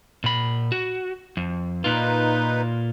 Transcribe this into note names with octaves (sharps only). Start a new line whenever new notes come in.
A#2 B5
F#4
F2
A#2 D#4 F4 B4